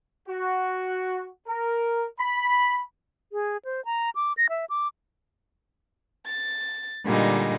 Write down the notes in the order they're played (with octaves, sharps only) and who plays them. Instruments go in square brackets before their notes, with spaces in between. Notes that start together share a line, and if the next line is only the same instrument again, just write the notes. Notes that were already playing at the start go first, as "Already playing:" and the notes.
[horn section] F#4
A#4
B5
[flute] G#4
C5
A#5
D6
A#6
E5
D6
[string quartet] A6
A#2 D3 G3 G#3 D#4